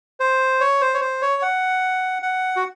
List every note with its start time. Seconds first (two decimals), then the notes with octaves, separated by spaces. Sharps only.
0.20 C5
0.61 C#5
0.81 C5
0.94 C#5
1.01 C5
1.22 C#5
1.42 F#5
2.22 F#5
2.56 F#4